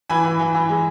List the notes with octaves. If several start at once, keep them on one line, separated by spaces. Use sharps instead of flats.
E3 G#5 B5
E3
E3
E3
G#3